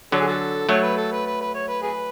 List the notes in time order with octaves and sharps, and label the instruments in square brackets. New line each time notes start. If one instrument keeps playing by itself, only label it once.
[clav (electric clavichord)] D3 F#3 [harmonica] A4
[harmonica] G#4
F#4 A4
[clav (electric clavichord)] F#3 A3 [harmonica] C#5
[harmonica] B4
A4
B4
B4
B4
C#5
B4
G#4 B4